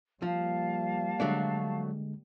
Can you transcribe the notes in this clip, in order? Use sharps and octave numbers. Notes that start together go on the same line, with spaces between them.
F3 G3 A#3 F5 A5
D3 F#3 G#3 A3 D4